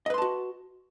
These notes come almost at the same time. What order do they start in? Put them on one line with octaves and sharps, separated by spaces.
D#5 B4 C6 A5 F#4